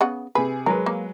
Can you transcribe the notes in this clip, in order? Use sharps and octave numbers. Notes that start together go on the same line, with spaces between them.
C#3 B3 F#5
C3 G#4 B4
F#3 G#3 A#4 B4
A#3